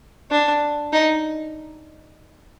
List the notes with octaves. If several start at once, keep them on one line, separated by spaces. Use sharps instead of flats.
D4
D#4